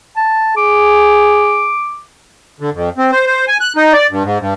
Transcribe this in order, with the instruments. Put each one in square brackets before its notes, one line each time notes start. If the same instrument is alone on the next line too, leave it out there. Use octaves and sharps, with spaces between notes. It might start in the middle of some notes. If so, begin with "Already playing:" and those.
[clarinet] A5
[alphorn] G#4 [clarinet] D6
[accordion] D3
F2
C4
C5
C5
G#5
F#6
D#4
D5
G2
G#2
G2